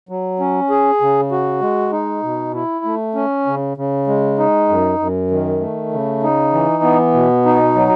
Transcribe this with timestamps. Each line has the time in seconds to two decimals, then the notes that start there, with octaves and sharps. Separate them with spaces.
0.09 F#3
0.40 C#4
0.70 G#4
1.01 C#3
1.31 F#4
1.61 G#3
1.92 D#4
2.23 B2
2.55 E4
2.85 A3
3.15 C#4
3.47 C#3
3.77 C#3
4.07 G#3
4.39 D#4
4.69 F#2
4.99 F#2
5.31 D#3
5.60 A3
5.92 C#3
6.23 D#4
6.53 E3
6.83 B3
7.14 B2
7.46 D#4
7.75 F#3